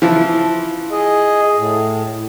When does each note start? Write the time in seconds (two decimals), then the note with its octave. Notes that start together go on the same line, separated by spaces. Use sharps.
0.02 E3 F3
0.91 G#4 D#5
1.57 A2